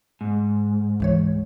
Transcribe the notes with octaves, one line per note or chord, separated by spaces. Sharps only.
G#2
C#2 E3 C#5